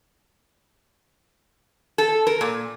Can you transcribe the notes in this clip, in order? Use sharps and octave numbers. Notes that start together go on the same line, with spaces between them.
A4
A#4
A#2